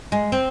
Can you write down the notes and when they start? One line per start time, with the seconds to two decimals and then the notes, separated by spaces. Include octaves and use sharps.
0.12 G#3
0.32 C4